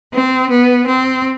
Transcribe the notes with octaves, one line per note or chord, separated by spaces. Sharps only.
C4
B3
C4